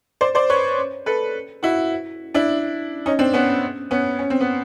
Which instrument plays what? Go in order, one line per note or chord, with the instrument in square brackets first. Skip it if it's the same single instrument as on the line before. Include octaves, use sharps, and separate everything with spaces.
[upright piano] C5 D5
C5 D5
B4 C#5
A4 B4
E4 F#4
D4 E4
C#4 D#4
C4 D4
B3 C#4
B3 C#4
C#4
C4
B3